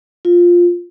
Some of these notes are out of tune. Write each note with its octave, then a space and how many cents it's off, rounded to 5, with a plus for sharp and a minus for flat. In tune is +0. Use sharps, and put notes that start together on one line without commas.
F4 +5